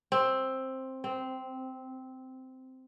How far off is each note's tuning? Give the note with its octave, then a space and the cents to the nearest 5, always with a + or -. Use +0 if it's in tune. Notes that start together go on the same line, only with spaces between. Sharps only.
C4 +10
C4 -10